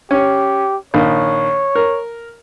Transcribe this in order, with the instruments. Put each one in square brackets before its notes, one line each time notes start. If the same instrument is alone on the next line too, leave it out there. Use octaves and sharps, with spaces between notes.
[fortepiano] C#4 [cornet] G4
[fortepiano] A#1 D#3 [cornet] C#5
[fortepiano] A#4